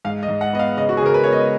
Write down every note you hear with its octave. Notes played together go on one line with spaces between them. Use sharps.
G#2 F5
D#5
G#2
F#5
B3 D#5
F5
C#3 D#5
F#4
G#4
C#3 A#4
B4
B3 C#5
D#5